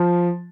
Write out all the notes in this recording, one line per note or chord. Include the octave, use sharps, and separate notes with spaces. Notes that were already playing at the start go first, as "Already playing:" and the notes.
Already playing: F3